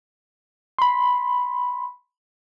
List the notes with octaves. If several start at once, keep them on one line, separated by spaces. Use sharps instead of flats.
B5 C6